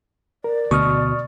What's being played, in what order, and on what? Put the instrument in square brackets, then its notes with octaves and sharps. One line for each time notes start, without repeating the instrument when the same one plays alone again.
[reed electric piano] A#4 [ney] D5
[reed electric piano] D2 [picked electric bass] B2 [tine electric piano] C#6 D#6 F6